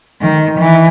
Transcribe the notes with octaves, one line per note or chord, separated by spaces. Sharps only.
D#3
E3